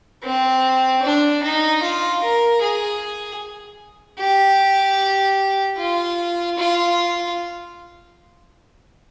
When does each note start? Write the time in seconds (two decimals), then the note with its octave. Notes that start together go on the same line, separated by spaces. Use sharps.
0.23 C4
1.02 D4
1.43 D#4
1.82 F4
2.22 A#4
2.61 G#4
4.20 G4
5.78 F4
6.58 F4